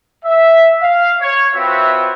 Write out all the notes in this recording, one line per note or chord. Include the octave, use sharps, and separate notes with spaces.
E5
F5
C#5
C4 F4 F#4 B4 C#5 E5